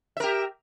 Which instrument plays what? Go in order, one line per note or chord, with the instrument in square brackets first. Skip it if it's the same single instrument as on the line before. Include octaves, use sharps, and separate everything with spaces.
[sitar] E5
A#4
G4